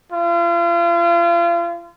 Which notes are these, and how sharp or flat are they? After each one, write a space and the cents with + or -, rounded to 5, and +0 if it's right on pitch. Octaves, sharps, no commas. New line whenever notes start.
F4 -35